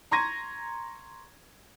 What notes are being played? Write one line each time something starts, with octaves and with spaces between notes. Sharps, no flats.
A#5 C6 C#6 G#6 A#6 D#7